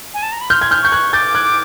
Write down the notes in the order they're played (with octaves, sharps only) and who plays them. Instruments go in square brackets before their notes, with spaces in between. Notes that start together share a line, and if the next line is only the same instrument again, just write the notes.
[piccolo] G#5
A5
A#5
B5
[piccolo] C6 [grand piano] F6 G6
[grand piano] G#6
F6 G6
[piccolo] C#6 [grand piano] G6
[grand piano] F#6 G#6
[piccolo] D6 [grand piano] G6 A6
[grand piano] F#6 G#6